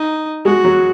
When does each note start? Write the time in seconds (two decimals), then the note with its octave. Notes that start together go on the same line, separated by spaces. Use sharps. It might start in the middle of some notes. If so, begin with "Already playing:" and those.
Already playing: D#4
0.45 G#3 F#4
0.65 F#3